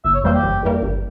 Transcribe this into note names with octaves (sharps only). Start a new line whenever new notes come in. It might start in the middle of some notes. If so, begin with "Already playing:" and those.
G1 E5
C#5
F2 E3 G3 A#3 C5
G4
G1
F2 E3 G3 A#3
G1